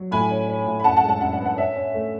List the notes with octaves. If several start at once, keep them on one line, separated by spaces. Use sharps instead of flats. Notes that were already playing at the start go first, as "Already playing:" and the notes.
Already playing: F#3
A2 G#5 B5
C#4
C#4
A2
B5
F#2 F#5 A5
F#5 A5
G#3
F#5 A5
F#2 F#5
F#5
B3
F#5
C#4 E5
C#4
A3